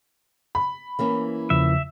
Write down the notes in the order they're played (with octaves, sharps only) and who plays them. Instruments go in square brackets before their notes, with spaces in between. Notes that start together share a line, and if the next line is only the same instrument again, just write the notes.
[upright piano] B5
[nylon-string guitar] E3 A#3 C#4
[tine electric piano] E2 C#3 F3 [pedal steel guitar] E5